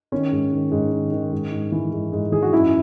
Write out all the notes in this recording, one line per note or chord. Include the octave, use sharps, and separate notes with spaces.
D#3 C#4
G#2
D#3
G#2
D#3
D#3
G#2
G#2
E3
G#2
G#2
E3 G#4
F#4
F#2 E4